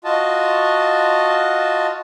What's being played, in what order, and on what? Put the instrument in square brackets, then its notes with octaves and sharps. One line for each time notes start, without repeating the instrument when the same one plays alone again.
[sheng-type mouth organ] F4 F#4 D#5 A5